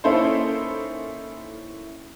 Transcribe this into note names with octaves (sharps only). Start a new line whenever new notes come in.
A#3 C#4 D#4 E4 A4 C5